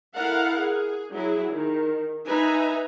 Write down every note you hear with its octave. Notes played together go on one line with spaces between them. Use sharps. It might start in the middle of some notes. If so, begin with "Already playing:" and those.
E4 A4 A#4 F5 F#5
G#4
F#3 E4 G#4
D#3
D#4 B4 E5 G#5 A#5